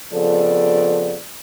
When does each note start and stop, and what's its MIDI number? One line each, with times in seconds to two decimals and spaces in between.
0.13 1.18 41
0.13 1.18 49
0.13 1.18 53
0.13 1.18 59
0.13 1.18 69
0.13 1.18 74